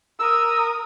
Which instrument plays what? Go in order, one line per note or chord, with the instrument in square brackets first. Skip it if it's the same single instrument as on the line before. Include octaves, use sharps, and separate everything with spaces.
[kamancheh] A#4 D#6 [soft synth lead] E6